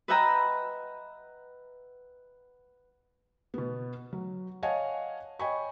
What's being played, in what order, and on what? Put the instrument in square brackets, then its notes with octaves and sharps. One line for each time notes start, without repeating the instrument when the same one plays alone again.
[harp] B4 D#5 E5 F#5 G5 A#5
[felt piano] B2 B3
F#3
C#5 D#5 F5 F#5 G#5 A5
C#5 D#5 G5 G#5 B5 C#6